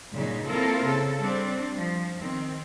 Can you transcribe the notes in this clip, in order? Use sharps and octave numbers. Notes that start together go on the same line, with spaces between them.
G2 A#2 C#3 F#3 D#4
A#3 C4 E4 F4 A4 A#4
C#3 A4
G3 C4 D4
F3
D#3 C4